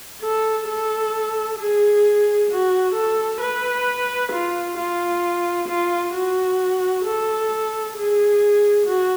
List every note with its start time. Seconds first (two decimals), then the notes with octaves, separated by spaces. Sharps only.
0.22 A4
0.68 A4
1.59 G#4
2.50 F#4
2.95 A4
3.41 B4
4.33 F4
4.78 F4
5.69 F4
6.13 F#4
7.05 A4
7.96 G#4
8.87 F#4